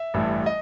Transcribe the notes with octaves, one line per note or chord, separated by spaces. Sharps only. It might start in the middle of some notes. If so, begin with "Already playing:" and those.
Already playing: E5
A1 G2 E3 A3
D#5